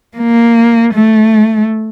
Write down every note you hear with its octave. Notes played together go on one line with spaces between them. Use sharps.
A#3
A3